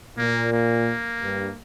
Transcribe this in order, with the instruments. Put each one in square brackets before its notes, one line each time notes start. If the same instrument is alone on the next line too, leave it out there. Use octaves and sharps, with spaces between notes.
[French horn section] A#2 [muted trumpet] A#3
[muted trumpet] A#3
[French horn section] G2